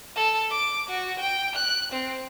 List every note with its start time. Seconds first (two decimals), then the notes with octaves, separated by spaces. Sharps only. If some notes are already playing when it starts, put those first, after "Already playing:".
0.16 A4
0.50 D6
0.89 F#4
1.19 G5
1.55 F#6
1.92 C4